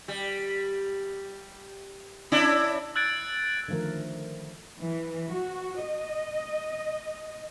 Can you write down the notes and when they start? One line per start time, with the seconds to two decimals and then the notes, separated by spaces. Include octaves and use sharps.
0.08 G3
2.32 C#4 D4 E4
2.96 E6 F#6 G#6 A6 D7
3.68 D3 D#3 F3 A3 A#4
4.80 E3
5.33 F#4
5.85 D#5